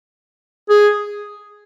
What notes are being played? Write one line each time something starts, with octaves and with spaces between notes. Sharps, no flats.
G#4